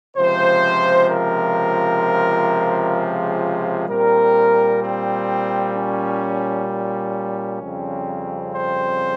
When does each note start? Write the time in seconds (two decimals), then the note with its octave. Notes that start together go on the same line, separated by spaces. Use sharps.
0.16 C#2 C3 F3 C5
1.09 A#4
2.95 G#4
3.89 A#2 G3 C4 A#4
4.82 C4
5.75 C#4
6.68 C#4
7.61 F2 C#3 G3 C4
8.54 C5